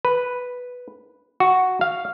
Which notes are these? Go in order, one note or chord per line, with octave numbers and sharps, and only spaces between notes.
B4
F#4
F5